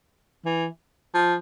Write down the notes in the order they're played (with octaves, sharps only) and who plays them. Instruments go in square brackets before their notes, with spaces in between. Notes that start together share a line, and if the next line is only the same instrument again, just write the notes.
[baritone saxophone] E3
F3